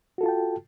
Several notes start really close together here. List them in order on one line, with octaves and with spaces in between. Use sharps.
F#4 A4 F4 A5 G5